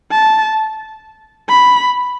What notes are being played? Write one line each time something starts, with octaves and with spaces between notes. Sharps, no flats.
A5
B5